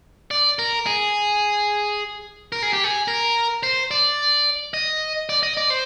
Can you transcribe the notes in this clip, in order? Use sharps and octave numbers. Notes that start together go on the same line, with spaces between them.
D5
A#4
G#4
A#4
G#4
G4
G#4
A#4
C5
D5
D#5
D5
D#5
D5
C5